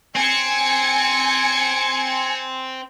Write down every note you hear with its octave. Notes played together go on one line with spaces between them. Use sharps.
C4 G#5 G#6 C#7